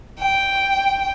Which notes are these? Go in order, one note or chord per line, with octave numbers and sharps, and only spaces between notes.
G5